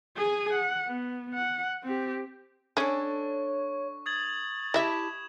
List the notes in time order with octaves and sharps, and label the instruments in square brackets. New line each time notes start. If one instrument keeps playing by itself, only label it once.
[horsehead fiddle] G#4 G#5
F#5
B3
F#5
C4 G4
[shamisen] C#4 G#4 [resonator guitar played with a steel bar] D4 A4 [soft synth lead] C#5 [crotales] C#6
[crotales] D#6 G#6 F#7 [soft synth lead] A6
[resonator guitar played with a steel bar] E4 G4 A5 [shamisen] D#5 E5 [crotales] E7